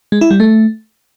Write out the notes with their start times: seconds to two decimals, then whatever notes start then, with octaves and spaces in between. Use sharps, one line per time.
0.12 G#3
0.21 E4
0.31 G3
0.40 A3